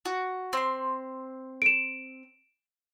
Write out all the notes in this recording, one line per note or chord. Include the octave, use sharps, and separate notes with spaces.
F#4
C4 C6
D7 E7